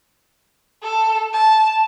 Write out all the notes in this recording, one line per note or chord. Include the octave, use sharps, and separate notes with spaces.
A4
A5